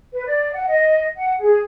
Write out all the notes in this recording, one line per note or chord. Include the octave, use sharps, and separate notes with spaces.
B4
D5
F#5
D#5
F#5
G#4